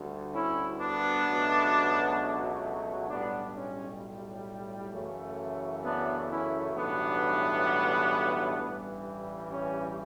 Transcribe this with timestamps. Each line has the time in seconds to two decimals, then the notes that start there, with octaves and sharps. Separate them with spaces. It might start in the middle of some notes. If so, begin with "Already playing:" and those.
Already playing: D2 D3 G3
0.34 C#4 E4
0.80 B3 D4
1.26 C#2 B2 F#3 A3
3.09 B1 A2 G3 B3 D4
3.55 C#4
4.93 F#2 C#3 E3 A3
5.84 B3 D4
6.30 C#4 E4
6.76 B1 A2 E3 G3 B3 D4
8.59 A1 G2 E3 G3
9.52 C#4